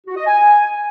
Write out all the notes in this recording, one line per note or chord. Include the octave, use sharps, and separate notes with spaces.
F#4
D#5
G#5